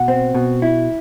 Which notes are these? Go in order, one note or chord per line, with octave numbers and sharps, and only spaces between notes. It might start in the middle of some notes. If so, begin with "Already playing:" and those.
Already playing: B2 F#5
C4
B2
E4